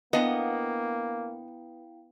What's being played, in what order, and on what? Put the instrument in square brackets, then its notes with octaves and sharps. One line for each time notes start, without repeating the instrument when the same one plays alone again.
[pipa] D3 D4 D#5 [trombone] A#3 [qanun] B3 [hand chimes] E4 F5 G5